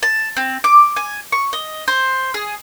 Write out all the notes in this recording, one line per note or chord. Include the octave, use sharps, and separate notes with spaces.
A5
C4
D6
G#5
C#6
D#5
C5
G#4